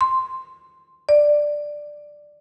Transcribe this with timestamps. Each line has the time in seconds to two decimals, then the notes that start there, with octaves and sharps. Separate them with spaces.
0.01 C6
1.09 D5